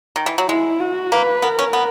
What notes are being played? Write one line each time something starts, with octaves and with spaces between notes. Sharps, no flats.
D#3
E3
F#3
G#3 E4
F#4
A#3 B4
B3 A#4
C#4
B3